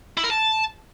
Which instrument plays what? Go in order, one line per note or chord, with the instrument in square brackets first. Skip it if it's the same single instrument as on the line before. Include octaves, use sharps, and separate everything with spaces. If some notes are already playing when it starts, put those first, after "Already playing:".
[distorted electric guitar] E4
A#4
A5